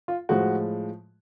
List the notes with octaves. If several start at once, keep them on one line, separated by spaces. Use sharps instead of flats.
F4
A2 F3 G#3 F#4